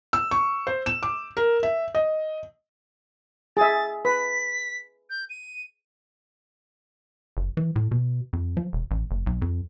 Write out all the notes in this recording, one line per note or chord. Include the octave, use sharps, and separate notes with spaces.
E6
C#6
C5
E7
D6
A#4
E5
D#5
G#4 E5 A6
B4 B6
G6
D#7
F#1
E3
A2
B2
F2
F3
E1
A1
F#1
B1
F2